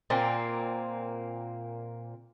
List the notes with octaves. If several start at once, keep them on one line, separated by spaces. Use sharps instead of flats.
A#2 A#3 C4